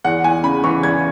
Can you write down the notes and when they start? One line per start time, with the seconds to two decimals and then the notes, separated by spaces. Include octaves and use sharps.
0.04 E2 F#5
0.24 E2 G#5
0.44 C#3 B5
0.64 E3 C#6
0.83 E2 G#6